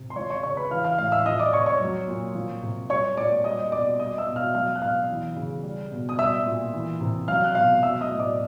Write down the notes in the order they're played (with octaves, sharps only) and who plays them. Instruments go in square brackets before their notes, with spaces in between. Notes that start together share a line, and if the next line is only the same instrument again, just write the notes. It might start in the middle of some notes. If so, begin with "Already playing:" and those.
Already playing: [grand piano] C3
C6
F3 C#5 C#6
C#5 C#6
C#3 C#5 C#6
B4 B5
E3 F5 F6
F5 F6
A2 F5 F6
E5 E6
F3 D#5 D#6
D5 D6
C3 C#5 C#6
C#5 C#6
F#3
A#2
F3
C3
G3 C#5 C#6
A#2 D5 D6
G3 D#5 D#6
B2 D5 D6
G3 D#5 D#6
E5 E6
B2
F5 F6
F#3 F5 F6
F#6
B2 F5 F6
E3
C#3
G3
B2
D#6
G3 E5 E6
A#2
E3
C3
F#3 F5 F6
F#6
B2 F5 F6
F#3 E5 E6
D#5 D#6
A2
D5 D6